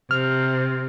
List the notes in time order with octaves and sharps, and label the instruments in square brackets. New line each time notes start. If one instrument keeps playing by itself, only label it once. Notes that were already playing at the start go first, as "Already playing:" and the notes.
[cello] C3 [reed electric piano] F6